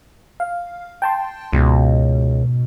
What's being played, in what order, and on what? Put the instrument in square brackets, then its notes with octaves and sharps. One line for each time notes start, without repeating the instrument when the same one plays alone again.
[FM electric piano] F5
G5 A5 C6
[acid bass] C#2 [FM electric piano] G#2 B2